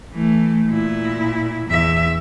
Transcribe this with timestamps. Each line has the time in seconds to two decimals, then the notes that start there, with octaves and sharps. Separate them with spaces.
0.12 E3 A3
0.69 A#2 E4
1.68 E2 E5